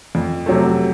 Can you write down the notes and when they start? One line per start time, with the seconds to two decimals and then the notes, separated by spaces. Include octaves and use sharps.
0.15 F2
0.46 C3 F#3 A3